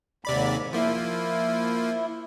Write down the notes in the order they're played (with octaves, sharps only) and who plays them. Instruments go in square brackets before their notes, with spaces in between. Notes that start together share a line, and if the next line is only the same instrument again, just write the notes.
[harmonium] D#2 G#2 [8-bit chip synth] C3 D5 B5
[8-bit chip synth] F3 A#3 [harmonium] E4